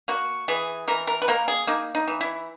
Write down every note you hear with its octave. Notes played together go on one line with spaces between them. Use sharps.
A#3 F#4
E3 G#4
E3 A#4
A#4
B4
A#3 A#4
G#4
A#3 D#4
D#4
E3
E4